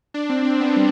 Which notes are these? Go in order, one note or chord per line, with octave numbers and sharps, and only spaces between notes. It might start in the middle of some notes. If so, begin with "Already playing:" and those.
D4
C4
C4
B3
G3